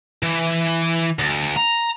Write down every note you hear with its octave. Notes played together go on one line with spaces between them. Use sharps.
E3
D2
A#5